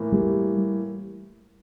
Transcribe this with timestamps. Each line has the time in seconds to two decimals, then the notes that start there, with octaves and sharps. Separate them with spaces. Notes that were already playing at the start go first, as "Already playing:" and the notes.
Already playing: A2 E3 A#3
0.12 G3